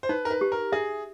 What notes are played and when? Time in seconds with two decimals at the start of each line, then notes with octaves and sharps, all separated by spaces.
0.03 C5
0.09 D#4 B4
0.25 A#4
0.31 B4
0.41 G4
0.52 A#4
0.72 G#4 E5